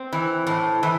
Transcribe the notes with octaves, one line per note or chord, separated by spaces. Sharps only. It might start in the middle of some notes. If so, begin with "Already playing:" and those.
Already playing: C4
E3
A2
E3